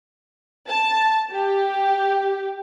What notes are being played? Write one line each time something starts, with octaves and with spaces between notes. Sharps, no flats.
A5
G4